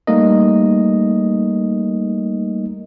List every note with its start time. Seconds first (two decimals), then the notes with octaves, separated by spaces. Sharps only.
0.07 G3 A3 A#3 D#4 A#4 D#5